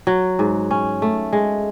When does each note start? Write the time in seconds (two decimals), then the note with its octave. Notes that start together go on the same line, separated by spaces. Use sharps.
0.07 F#3
0.39 G#2
0.71 C#4
1.02 A3
1.33 G#3